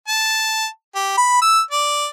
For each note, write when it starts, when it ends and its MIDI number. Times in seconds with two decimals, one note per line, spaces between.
0.08 0.67 81
0.95 1.16 67
1.18 1.38 83
1.42 1.60 88
1.71 2.07 74